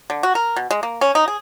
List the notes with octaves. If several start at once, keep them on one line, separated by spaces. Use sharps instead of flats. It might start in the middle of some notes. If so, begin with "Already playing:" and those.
D3
F#4
A#4
B2
G#3
A#3
C#4
D#4
G#4